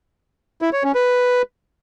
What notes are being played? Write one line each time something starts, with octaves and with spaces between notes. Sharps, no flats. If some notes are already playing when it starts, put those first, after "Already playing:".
E4
C#5
C#4
B4